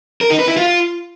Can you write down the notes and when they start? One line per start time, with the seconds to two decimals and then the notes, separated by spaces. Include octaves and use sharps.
0.21 A#4
0.30 D#4
0.39 B4
0.48 E4
0.57 F4